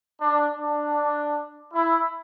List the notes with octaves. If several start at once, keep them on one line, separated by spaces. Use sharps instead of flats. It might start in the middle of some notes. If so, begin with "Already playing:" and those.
D4
D4
E4